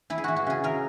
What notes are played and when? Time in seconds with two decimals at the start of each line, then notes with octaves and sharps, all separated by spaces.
0.10 E3 E4
0.18 G#4
0.24 E3 F#4
0.36 F#4
0.46 C#3 G#4
0.64 E3 A#4